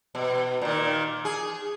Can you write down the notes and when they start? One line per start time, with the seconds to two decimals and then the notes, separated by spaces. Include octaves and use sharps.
0.15 B2
0.61 A#2 D#3
1.25 G#4